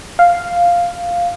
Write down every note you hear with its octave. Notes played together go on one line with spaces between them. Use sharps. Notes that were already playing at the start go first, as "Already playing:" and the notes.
F5